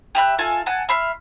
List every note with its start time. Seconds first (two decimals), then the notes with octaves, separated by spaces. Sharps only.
0.15 G4 E5 B5 F#6
0.38 F4 A4 G#5
0.66 F#5 G#5 A5
0.89 E5 B5 C6 F6